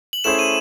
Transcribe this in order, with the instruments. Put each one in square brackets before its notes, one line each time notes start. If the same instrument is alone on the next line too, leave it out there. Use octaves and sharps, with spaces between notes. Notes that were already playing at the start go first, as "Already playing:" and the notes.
[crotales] F#7
[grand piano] A3 C#4 E4 G#4 C5 [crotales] E7
[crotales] D#7